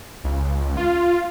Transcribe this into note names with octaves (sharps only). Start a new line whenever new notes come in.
C#2
F4